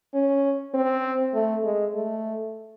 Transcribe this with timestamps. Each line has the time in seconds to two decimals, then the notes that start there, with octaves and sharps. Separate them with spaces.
0.14 C#4
0.74 C4
1.34 A3
1.64 G#3
1.95 A3